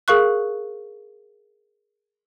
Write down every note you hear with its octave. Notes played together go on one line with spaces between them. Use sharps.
G#4 A#4 F5 C#6 F#6